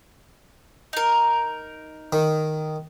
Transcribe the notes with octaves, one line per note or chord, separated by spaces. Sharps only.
D#4 A#4
D#3